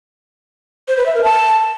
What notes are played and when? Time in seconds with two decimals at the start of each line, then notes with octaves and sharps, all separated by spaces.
0.88 C5
0.97 B4
1.06 E5
1.15 A#4
1.24 A5